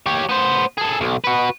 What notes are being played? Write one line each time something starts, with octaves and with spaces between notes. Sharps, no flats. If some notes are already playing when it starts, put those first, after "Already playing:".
G4 C#5
B3 C5
G#4 A4
B1
F#4 B4